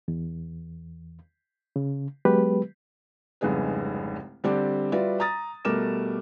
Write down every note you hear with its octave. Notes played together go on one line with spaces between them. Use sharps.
E2
C#3
F#3 G#3 B3 G4 B4
F1 C2 G#2 C#3 G#4 B4
D3 G3 C4 D4 G4 D5
G3 F4 F#4 B4 D5 E5
A#5 D#6 A6
B2 G3 A3 A#4 D6 E7